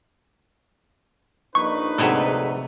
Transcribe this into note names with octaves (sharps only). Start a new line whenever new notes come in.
A#1 D#4 B4 C#6
D2 G#2 C3 F#3 G#4 A4